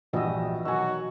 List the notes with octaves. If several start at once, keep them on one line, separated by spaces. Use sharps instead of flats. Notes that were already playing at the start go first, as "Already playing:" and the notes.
A#1 E3 G3 F#4 D#5 E6
B2 D#3 F#3 D#4 F#4 G#5 E6